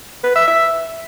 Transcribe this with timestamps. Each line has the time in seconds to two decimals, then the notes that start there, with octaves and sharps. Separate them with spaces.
0.24 B4
0.36 E5
0.48 E5